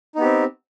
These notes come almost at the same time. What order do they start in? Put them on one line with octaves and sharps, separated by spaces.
D#4 B3 G4 C4